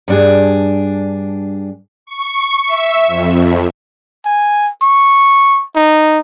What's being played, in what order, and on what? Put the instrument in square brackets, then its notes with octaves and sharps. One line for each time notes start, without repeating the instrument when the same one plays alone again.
[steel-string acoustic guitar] G2 D4 G#4
[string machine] C#6
E5
F2
[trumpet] G#5
C#6
D#4